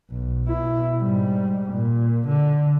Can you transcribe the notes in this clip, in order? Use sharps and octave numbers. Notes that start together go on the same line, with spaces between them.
B1
B2 E4
G#2 G3
A#2
D3